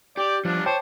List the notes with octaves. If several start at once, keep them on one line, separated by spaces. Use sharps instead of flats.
G4 D5
F3 G3 D4 F4
C5 C#5 G5 A5 D6